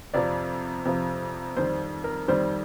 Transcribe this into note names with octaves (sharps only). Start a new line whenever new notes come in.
F2 C3 F3 D5
F2 C3 F3
F2 D#3 G3 C5
A#4
F2 D#3 G3 C5